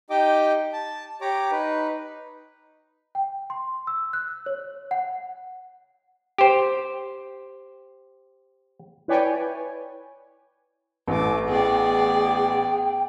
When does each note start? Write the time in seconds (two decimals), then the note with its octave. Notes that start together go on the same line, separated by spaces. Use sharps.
0.10 D#4 G4 D#5 G5 D6
0.73 A5
1.21 G4 C#5 A#5 D6
1.51 D#4 B4
3.15 G5
3.50 C6
3.87 E6
4.13 F#6
4.46 C#5
4.91 F#5
6.38 G4 C5
9.08 E4 B4 C#5 D5 G5 G#5
11.07 A1 A3 D6
11.48 B3 G#4 D5 G5